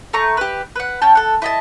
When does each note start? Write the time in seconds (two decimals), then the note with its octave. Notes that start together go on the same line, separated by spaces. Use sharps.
0.13 A3 A#5 C#6
0.37 G4 B4
0.76 B4 F#5
1.02 C#4 G5 A5
1.15 A4 F#5
1.42 E4 D#5 A5